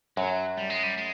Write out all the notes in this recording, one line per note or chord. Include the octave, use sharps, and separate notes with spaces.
F#2 F#3
G3
G#3
G3
G#3